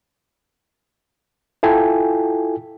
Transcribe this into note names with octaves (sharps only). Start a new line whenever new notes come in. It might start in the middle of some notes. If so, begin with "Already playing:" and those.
E4 F4 A4 G5 G#5